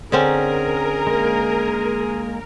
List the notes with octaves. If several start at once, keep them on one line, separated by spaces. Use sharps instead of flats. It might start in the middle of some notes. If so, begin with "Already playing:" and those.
D3 C4 C#4 G#4 A#4
G#3 A#3